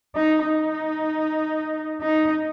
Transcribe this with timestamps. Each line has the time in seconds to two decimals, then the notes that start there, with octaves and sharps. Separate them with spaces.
0.15 D#4
0.45 D#4
2.01 D#4